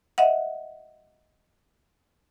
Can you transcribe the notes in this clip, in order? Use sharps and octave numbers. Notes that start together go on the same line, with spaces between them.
D#5 E5 F#5